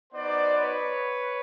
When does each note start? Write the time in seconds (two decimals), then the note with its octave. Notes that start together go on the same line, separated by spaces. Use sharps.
0.13 B3 D#4 F#4 C5 D5
0.56 B4 C#5